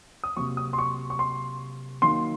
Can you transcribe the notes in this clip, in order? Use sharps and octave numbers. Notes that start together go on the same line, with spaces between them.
D#6
C3 F#3 A#3 C#6
D#6
C6
C#6
C#6
C6
D#3 F#3 A#3 C6